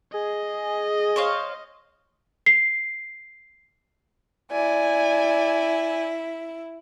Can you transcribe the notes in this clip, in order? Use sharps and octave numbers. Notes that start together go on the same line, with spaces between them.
G#4 D#5
C5 C#5 F5
C7
E4 D5 G#5